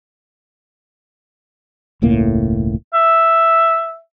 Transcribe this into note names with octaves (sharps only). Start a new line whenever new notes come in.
E1 C#2 A2 A#3
E5